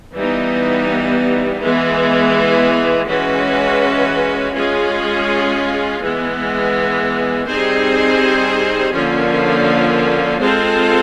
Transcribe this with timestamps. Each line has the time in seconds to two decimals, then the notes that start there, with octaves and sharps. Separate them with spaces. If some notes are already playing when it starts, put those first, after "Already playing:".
0.14 E3 G3 B3 D#4
1.61 E3 G#3 B3
3.07 E3 G#3 C#4 F#4 B4
4.54 G#3 C#4 F4 G#4
6.01 E3 G#3 B3
7.47 G3 C4 D#4 G#4 C5
8.94 D3 F3 A#3 C#4 F4
10.40 G#3 C4 F4 A4 C5